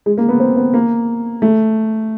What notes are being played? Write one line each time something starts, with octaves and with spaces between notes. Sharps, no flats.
G#3
A#3
B3
C4
B3
A#3
A3